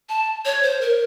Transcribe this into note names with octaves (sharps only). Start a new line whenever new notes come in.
A5
C#5
C5
A#4